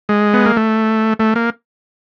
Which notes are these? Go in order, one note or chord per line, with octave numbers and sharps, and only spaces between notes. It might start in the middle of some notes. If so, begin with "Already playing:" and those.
G#3
B3
A#3
A3
A3
A#3